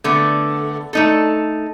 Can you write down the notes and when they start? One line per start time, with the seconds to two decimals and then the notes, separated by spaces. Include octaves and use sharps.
0.04 D3 A3 B3
0.93 A3 D#4 A4